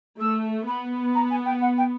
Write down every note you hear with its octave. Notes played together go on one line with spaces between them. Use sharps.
A3 E6
B3 B5
A#5
G#5
G5
F#5
G5